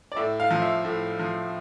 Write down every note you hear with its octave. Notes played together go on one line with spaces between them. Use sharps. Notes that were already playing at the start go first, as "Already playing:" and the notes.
D5
A2 E5
F5
F3
E5
A2
F3